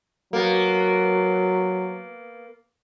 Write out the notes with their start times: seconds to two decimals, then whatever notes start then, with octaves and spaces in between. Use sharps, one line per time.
0.33 F#3 A#3 B3